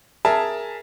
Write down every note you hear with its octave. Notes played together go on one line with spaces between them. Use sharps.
G#4 A#4 E5 A5